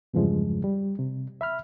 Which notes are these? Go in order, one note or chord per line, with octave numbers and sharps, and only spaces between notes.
E2 G2 C#3 F3 G#3
G3
C3
E5 B5 F6